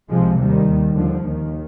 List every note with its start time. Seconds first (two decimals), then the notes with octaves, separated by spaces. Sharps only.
0.09 C2 C3 F3 G#3
0.38 D#2 D#3 G3
0.66 D#2
0.95 D#2 D3 F3
1.23 D#2 D#3